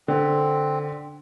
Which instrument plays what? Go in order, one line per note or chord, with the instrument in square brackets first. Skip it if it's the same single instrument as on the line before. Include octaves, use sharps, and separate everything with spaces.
[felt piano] D3 [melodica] C4